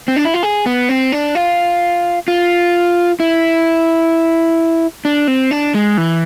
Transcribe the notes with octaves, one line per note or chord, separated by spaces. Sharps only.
C4
D4
E4
F4
G#4
B3
C4
D4
F4
F4
E4
D4
C4
D4
G#3
E3